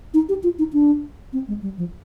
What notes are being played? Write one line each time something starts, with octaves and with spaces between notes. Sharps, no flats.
D#4
G4
F4
D#4
D4
C4
G#3
G3
F3